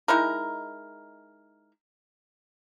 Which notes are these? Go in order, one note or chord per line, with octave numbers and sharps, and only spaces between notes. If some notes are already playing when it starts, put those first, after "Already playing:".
G#3 D#4 E4 A#4